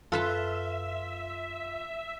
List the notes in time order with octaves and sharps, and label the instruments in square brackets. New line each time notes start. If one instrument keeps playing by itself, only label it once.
[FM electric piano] F#2 [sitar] F4 [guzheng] A4 B4 A5 [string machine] E5